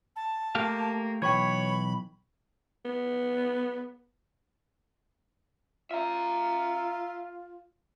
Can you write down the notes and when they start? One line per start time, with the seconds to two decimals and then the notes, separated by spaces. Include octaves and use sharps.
0.16 A5
0.55 A3 A#3 G4 F5
1.22 B1 E3 C#5 G5 B5 C#6 G#6
2.85 B3
5.91 F4 E5 A#5